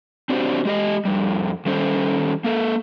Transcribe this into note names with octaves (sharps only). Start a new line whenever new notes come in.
C4 D4 F#4 G4 C5
G#3 G4 D#5
F2 G3
D#3 G3 C#4 A4 C5
A#3 A4